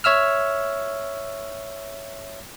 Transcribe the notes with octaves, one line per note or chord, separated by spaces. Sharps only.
C#5 E5 E6 F6